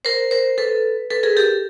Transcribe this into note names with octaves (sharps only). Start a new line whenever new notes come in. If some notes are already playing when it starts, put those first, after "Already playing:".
A#4 C5
A#4 C5
A4 B4
A4 B4
G#4 A#4
G4 A4